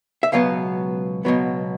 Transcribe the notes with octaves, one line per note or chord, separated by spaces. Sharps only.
E5
C#2 B2 F#3 B3 F5
C#2 B2 F#3 B3